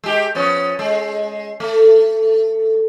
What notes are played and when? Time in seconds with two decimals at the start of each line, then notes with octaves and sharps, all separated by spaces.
0.04 G#3 G4
0.35 F3 B3 C#4
0.79 G#3
1.60 A3